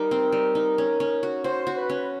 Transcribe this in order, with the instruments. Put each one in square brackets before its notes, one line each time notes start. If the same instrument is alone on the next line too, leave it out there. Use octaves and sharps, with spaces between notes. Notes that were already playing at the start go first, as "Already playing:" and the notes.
Already playing: [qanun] G3 D#4 [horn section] A#4
[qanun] C4
G3
D#4
C#4
C#4
F#4
[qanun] F#4 [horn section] C5
[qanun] F#4
[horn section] B4
[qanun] C#4